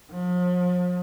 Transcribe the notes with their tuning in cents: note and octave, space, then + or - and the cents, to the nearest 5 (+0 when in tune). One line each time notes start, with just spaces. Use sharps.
F3 +40